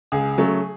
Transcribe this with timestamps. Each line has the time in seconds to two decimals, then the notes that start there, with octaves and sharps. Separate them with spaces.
0.12 C#2 G#4
0.38 C#3 F#3 A3